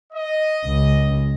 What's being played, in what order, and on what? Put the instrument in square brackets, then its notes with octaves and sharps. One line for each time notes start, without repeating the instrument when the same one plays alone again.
[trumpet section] D#5
[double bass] C#2